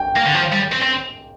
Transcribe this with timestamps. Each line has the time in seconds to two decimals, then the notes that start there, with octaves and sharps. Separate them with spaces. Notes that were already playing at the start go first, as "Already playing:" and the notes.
Already playing: G5
0.16 A#3
0.26 D3
0.34 F3
0.52 G3
0.72 C4
0.82 C4